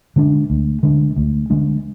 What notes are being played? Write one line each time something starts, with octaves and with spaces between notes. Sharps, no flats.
D3 G#3 D4
D2
D3 G#3 D4
D2
D3 G#3 D4